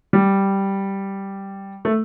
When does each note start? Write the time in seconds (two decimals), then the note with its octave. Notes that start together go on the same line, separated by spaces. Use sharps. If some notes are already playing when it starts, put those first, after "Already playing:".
0.13 G3
1.85 A3